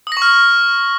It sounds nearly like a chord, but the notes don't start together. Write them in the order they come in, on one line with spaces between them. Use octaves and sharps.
D#6 A#6 C#6 F6